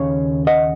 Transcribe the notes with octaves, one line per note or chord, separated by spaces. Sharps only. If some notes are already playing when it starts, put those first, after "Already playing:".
Already playing: D#2 C#3 C#4 C#5 F5
D#5 F#5